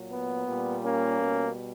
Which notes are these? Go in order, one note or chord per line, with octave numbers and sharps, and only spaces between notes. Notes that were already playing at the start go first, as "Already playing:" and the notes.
Already playing: A#2 F#3
B3
A#2 G3
A#3 C#4
B2 G3